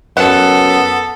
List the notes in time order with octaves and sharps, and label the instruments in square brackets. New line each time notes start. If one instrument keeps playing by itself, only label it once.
[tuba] F#2 [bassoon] B3 [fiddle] A4 [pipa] F#5